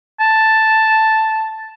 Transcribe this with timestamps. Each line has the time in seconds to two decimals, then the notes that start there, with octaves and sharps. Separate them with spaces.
0.20 A5